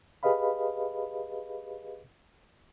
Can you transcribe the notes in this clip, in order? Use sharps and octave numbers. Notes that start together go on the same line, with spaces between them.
G4 G#4 B4 D#5 F5 B5